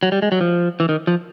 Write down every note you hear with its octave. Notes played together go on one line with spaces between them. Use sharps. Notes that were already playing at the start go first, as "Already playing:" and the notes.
F#3
G3
G#3
F#3
F3
E3
D#3
F3